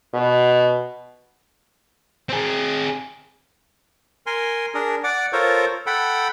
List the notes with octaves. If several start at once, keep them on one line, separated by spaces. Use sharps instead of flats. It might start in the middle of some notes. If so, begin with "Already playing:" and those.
B2
C4 G#4
A#4 G#5 C6
D4 G#4 A#4
D5 F#5 D6
F4 A4 A#4 C5 C#5
A4 F#5 G5 B5